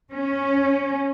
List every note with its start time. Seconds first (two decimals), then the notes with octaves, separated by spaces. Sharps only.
0.12 C#4